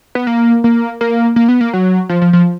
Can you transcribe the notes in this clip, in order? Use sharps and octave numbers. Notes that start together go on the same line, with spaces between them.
B3
A#3
A#3
A#3
A#3
B3
A#3
F#3
F3
F3
F3